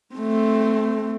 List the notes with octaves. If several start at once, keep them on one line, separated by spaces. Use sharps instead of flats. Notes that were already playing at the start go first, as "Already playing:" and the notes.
A3 C4